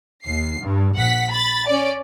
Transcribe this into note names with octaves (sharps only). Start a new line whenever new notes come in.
D#2 C7
G2
A#1 F#5 B6
B5 A6
C#4 D5